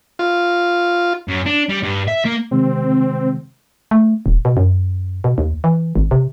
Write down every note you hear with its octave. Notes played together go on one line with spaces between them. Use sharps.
F4
F#2
D4
G3
G2
E5
A#3
C3 D#3 G#3 C4
A3
D#1
B2
F#2
B2
D#2
E3
G#1
C3